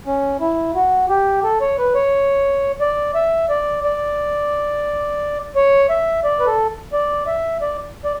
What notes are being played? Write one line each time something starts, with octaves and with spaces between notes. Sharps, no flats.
C#4
E4
F#4
G4
A4
C#5
B4
C#5
D5
E5
D5
D5
C#5
E5
D5
B4
A4
D5
E5
D5
D5